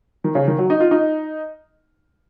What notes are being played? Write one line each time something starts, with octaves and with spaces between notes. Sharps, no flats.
D#3
C#3
D#3
F#3
D#4
F4
D#4